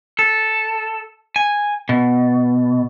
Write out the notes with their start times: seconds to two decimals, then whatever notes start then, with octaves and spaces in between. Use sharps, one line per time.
0.19 A4
1.36 G#5
1.89 B2